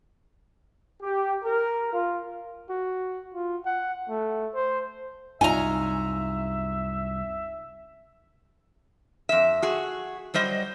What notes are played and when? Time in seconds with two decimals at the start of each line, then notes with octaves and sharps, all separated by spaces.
1.02 G4
1.43 A#4
1.93 F4
2.70 F#4
3.34 F4
3.65 F#5
4.09 A3
4.54 C5
5.41 C2 F#2 D#4 F4 C#5 E5 G#5 A#5
9.29 F2 E5
9.62 F#4 G#4
10.34 F#3 G3 C5 D#5